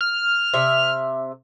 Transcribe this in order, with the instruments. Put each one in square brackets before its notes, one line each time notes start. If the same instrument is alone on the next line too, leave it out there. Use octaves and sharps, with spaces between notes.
[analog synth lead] F6
[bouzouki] C3 E5